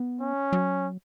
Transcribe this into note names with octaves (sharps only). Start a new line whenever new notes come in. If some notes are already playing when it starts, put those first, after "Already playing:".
Already playing: B3
C#4
F#3